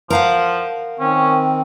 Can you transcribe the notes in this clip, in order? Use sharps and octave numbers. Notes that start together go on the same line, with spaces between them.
F3 A#4 F5 F#5
D#3 C4 C#4